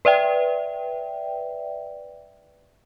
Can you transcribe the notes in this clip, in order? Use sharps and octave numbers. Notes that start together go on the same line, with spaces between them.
B4 D5 E5 G5